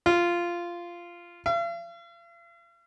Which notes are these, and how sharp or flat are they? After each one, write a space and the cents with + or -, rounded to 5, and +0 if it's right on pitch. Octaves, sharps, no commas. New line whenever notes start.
F4 -10
F5 -45